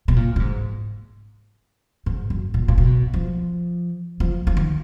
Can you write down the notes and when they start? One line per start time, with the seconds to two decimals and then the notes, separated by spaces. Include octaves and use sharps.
0.08 B2
0.16 A#2
0.36 A#2
0.40 G#2
2.06 G#2
2.30 F#2
2.54 A#2
2.68 A#2
2.78 B2
3.14 F3
4.20 F3
4.47 F3
4.57 D#3